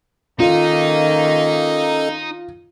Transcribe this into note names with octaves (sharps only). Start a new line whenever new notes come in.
D#3 A#3 C#4 D#4 F4 A4 D#5